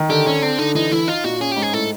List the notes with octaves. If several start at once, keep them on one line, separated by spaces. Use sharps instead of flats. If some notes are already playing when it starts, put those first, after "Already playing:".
Already playing: D#3
D3 G4
D3 C#4
C4 D4
D3 D#4
E3 D#4
E3 E4
D#4 F4
A#2 F#4
C#4 G#4
G#2 G4
G#4
A2 A4